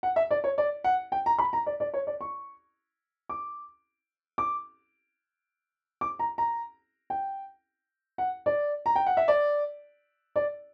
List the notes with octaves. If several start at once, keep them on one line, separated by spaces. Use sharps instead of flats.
F#5
E5
D5
C#5
D5
F#5
G5
A#5
B5
A#5
D5
D5
C#5
D5
C#6
D6
D6
D6
A#5
A#5
G5
F#5
D5
A#5
G5
F#5
E5
D5
D5